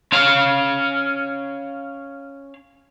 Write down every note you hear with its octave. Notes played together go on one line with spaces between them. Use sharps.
C#4 F5